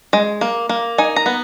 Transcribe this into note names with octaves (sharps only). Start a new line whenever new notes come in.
G#3
A#3
A#3
D#4 G#5
A#5
B3